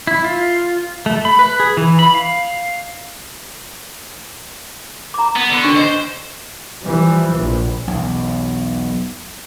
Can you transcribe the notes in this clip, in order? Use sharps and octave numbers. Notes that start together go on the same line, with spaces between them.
E4
F4
A3
B5
B4
G#4
E3
B5
F5
A#5 D6
B3
D3
D4 C#6
C5 D#5
E3 F3 G3
A#1
B1 E2